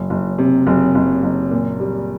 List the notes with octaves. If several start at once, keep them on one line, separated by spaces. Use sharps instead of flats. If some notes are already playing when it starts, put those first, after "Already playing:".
Already playing: F#1
F#1
C3
F#1
F#1
F#1
A#2
G3